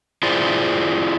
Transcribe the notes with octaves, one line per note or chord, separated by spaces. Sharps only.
E4 F4 G#4 C5 D5